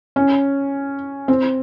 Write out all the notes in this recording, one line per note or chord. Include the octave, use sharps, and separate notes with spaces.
C#4
C4